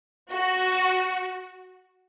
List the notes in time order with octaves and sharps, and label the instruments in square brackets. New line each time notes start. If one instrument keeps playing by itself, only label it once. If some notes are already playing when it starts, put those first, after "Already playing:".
[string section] F#4